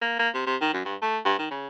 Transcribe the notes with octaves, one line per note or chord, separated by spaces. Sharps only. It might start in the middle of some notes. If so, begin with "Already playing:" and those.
A#3
A#3
C3
C3
D#3
F#2
G2
A3
G2
D#3
C#3